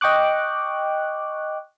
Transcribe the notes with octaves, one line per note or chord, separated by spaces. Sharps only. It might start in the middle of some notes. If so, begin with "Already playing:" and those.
D#5 G5 C#6 D6 F#6